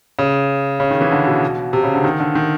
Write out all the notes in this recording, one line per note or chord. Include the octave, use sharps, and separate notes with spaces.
C#3
C#3
D#3
E3
D3
B2
C3
C#3
D3
D#3
D3
D#3